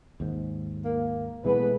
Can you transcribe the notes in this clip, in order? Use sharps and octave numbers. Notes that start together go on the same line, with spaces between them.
D#2 G#2
A#3
B2 E3 G#3 A3 B3 G#4 B4